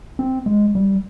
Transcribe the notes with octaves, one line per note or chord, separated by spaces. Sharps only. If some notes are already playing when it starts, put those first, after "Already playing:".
C4
G#3
G3